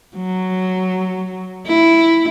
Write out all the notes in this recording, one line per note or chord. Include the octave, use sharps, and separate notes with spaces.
F#3
E4